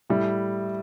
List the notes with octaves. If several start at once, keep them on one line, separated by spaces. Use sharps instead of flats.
A2 G3 E4